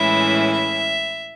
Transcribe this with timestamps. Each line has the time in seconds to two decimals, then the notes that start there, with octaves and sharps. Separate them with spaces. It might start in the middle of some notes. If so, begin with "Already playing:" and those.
Already playing: A2 E3 G#3 C#4 E4 E5
0.51 E5